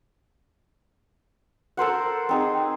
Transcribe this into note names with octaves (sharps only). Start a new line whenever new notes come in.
A4 A#4 C5 F#5
C4 D#4 G#4